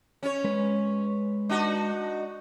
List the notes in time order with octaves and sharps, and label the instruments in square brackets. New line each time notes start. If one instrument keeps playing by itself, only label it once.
[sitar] C#4 C#5
[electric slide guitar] G#3 B4
[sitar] D4 D#4 F#4